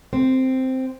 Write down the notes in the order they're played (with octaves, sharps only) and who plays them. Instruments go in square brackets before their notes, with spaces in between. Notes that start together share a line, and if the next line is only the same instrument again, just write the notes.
[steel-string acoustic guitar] C4